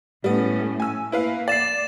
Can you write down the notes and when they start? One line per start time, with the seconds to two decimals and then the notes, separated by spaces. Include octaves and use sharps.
0.24 A2 G3 A3 B3 C#4
0.80 G#5 E6
1.12 A#3 E4 B4 F5
1.48 D5 A6 C7 E7